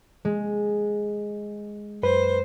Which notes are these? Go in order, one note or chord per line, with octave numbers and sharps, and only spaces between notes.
G#3
F#2 B4 C5